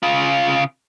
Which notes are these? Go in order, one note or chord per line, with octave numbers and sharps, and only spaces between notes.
C#3 F4